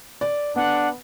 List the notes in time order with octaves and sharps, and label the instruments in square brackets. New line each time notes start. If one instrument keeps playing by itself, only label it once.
[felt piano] D5
[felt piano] B3 [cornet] D4 [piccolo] F#5